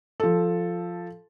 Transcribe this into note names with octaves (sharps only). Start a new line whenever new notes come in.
F3 A4